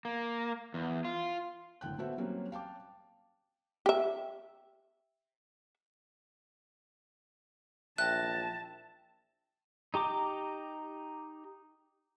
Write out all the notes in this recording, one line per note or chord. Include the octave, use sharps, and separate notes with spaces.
A#3
E2
F4
F#1 A2 D3 G5 F#6
A3 B3 F#4 C5 E5 F#5
F#3 G3 A#3 C4 C#4
F5 G5 A5 D6
G4 E5
A#1 E5 G5 A5 F#6 A#6
D#4 G4 A#5 D6